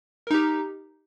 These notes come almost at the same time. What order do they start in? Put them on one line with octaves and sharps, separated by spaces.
A#4 D#4 G4